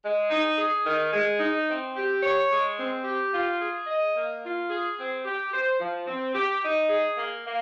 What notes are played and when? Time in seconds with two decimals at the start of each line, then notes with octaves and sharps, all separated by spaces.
0.03 G#3
0.31 D#4
0.58 G#4
0.85 D#3
1.13 G#3
1.40 D#4
1.68 C4
1.96 G4
2.23 C#5
2.50 G#3
2.78 C4
3.04 G4
3.32 F4
3.60 G#4
3.87 D#5
4.16 A#3
4.43 F4
4.70 G#4
4.98 C4
5.25 G4
5.53 C5
5.80 F3
6.07 C4
6.35 G4
6.62 D#4
6.90 G#4
7.17 A#3
7.44 A#3